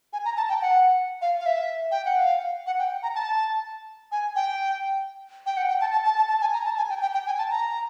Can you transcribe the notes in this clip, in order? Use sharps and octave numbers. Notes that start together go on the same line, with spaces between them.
G#5
A#5
A5
G5
F#5
F5
F5
E5
G5
F#5
F5
F#5
G5
A#5
A5
G#5
G5
G5
F#5
G5
A5
A5
A5
A5
A5
G#5
A#5
A5
G#5
G5
G5
G5
G#5
A5
A#5